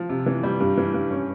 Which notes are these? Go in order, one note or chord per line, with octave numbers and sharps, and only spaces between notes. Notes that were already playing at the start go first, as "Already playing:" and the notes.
Already playing: F3
C3
E3
G3
G2
E3
G2
C#4